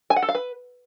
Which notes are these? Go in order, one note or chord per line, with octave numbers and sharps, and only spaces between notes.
G#5
F#5
A4
F5
B4